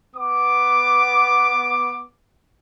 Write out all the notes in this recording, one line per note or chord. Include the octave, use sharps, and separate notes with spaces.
B3 D6